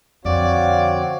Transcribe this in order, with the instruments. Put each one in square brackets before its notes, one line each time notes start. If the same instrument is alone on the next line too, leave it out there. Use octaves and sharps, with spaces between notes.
[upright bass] F2 D3 [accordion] C4 F#4 C#5 [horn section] D5 F5